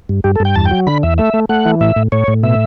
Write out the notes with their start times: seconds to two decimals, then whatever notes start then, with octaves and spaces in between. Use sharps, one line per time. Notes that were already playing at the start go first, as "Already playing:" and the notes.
0.09 G2
0.24 G2 G4
0.35 A4
0.40 G2 G5
0.56 E2 A5
0.65 G5
0.71 F#3
0.87 D3 B5
1.03 E2 E5
1.18 A3 E5
1.34 A3
1.49 A3 F#5
1.66 E3
1.81 A2 E5
1.96 A2
2.12 A2 C#5
2.28 A2
2.43 B2 E5